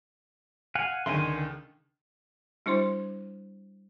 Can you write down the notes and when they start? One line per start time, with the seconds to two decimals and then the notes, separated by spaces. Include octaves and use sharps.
0.75 F5 F#5 G#5
1.06 C#2 D3 D#3 G#5 C6
2.66 G3 D4 E4 C5 C6